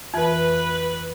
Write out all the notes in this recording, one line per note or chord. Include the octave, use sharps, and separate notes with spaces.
F2 E3 B4